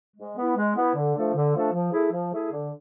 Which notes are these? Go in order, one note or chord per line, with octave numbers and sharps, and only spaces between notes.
G#3
B3 E4
G#3
B3 E4
D3
F3 A3 D4 A4
D3
F3 A3 D4 A4
F3
A3 E4 G#4
F3
A3 E4 G#4
D3